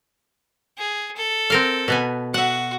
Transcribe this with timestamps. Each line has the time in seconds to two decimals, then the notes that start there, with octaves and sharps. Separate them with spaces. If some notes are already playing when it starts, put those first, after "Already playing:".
0.78 G#4
1.16 A4
1.50 C4 A#4 F5
1.88 B2 B3 G#5
2.34 F#4 E5 F#5